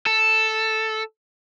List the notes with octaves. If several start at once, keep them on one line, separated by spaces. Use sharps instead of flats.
A4